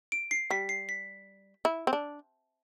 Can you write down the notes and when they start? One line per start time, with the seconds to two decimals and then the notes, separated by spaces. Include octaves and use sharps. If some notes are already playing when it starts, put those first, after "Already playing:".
0.12 D7
0.31 C7
0.50 G3 B6
0.69 C7
0.89 B6
1.65 E4
1.87 C4
1.93 D4